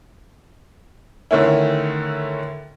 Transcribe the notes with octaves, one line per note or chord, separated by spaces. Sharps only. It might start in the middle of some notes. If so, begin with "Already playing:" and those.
D3 D#3 A3 C#4 E4